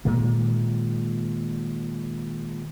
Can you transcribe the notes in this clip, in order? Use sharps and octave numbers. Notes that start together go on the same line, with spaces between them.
A#2 D#3 G#3